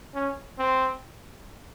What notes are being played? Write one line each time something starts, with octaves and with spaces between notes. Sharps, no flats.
C#4
C4